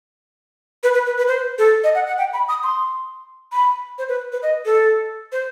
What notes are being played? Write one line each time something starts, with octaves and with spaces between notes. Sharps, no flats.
B4
B4
B4
B4
C5
A4
D#5
F#5
F#5
G5
B5
D#6
C6
B5
C5
B4
B4
D#5
A4
C5